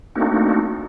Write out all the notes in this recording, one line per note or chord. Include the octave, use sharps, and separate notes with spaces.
A3 A#3 C4 D4 D#4 F#4